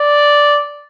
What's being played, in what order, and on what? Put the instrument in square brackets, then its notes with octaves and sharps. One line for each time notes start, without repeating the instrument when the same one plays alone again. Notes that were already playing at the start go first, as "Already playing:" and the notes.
Already playing: [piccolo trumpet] D5